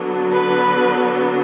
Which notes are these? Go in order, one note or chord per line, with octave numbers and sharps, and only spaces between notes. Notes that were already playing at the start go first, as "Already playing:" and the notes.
Already playing: D3 F#3 B3 D4
B4